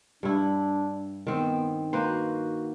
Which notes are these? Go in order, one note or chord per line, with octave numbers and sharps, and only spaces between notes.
G2 D4 E4
D#3 B3 C4
A#3 F#4 B4 C5